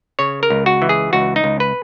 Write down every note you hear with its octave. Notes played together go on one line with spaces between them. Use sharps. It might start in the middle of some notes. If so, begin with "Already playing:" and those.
C#3 C#5
A#4
C#2
F#4
E3
G#4
C#2 F#4
D#4
C#2
B4